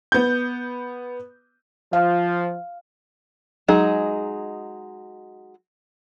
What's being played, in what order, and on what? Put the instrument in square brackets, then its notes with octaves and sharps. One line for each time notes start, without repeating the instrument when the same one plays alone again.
[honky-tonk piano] B3 G6
[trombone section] F3 [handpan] F5
[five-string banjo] F#3 G#3 D#4 G#4